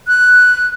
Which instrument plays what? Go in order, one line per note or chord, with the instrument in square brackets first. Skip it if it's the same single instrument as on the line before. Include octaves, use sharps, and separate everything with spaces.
[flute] F#6